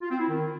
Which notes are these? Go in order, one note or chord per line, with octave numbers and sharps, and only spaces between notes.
F4
C4
E4
D#3